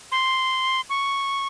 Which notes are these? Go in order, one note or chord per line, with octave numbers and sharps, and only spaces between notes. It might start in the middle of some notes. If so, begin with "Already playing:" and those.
C6
C#6